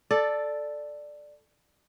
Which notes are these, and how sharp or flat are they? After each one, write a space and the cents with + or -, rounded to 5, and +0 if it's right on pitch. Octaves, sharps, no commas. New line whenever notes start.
A4 +0 D5 +10